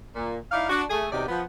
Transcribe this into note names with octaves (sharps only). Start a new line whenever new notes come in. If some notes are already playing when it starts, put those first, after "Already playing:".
A#2
D#4 E4 D5 F5
D4 F#4
A3 G#4
E2 C3 F#3 D#4 G4 D5
F3 B3